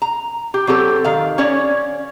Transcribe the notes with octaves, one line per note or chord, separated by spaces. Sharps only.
A#5
G4
F#3 C4 G4 A4
D#3 F5
C#4 C#5 D5